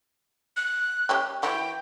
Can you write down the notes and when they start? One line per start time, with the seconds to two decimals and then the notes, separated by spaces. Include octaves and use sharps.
0.57 F#6
1.09 G3 C#4 G4
1.43 E3 E4 F#4 G5